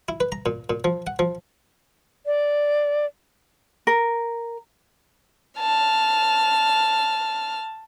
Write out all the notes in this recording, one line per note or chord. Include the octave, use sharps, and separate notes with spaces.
E4
B4
A#5
A#2
A#2
F3
F#5
F3
D5
A#4
A5 F6